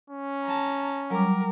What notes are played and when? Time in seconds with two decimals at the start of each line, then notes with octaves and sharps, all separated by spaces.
0.10 C#4
0.44 A5 A#5
1.10 F#3 G3 A#4 D6